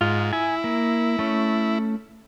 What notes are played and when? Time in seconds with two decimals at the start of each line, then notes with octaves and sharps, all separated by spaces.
0.01 G#2 F4
0.33 E4 G#5
0.64 A#3
1.19 A3 C#4